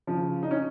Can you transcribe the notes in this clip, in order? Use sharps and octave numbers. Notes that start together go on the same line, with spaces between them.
C#3 F3
D#4
C#4